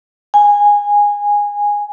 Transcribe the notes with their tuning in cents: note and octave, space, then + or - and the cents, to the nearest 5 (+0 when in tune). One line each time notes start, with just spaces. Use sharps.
G#5 -15